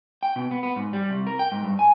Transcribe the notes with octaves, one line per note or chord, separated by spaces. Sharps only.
G5
B2
B3
B3
G#2
G3
C2
A#4
G5
G#2
G2
G#5